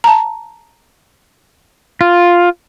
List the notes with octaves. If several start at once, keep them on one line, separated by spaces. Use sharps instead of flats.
A5 A#5
F4